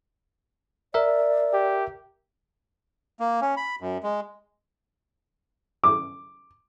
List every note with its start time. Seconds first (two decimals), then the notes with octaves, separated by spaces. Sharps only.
0.94 A#4 D5 E5
1.53 G4
3.20 A#3
3.42 C#4
3.57 B5
3.81 F#2
4.03 G#3
5.84 D6